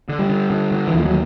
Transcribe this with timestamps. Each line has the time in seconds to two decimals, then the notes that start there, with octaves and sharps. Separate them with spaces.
0.09 D3
0.19 G3
0.29 D3
0.50 D3
0.72 D3
0.88 E3
0.94 D#2 F3
1.05 F#3